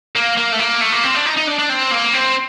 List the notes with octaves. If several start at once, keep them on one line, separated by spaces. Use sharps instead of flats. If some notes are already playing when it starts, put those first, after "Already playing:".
A#3
A#3
A3
A#3
A3
A#3
C4
D4
D#4
D#4
D4
D4
C4
A#3
C4